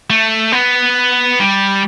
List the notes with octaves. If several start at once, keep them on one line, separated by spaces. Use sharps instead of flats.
A3
B3
G3